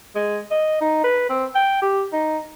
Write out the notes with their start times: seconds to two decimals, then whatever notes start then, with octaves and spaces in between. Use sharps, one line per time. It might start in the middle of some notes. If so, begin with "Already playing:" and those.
0.16 G#3
0.51 D#5
0.81 D#4
1.04 B4
1.30 C4
1.55 G5
1.82 G4
2.13 D#4